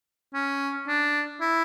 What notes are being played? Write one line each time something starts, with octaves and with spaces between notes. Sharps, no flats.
C#4
D4
E4